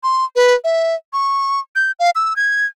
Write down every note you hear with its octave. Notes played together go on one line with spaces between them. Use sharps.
C6
B4
E5
C#6
G6
F5
E6
G#6